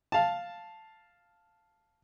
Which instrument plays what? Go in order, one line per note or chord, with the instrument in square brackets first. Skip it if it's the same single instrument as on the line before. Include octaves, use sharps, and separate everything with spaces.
[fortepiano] F5 A5